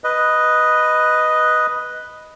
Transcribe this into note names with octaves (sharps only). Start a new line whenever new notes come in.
B4 D#5